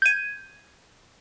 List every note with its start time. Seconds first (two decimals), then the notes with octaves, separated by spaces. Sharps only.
0.02 G6 G#6 D#7